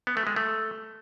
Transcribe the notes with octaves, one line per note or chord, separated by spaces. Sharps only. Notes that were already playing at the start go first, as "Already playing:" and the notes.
B3
A3
G#3
A3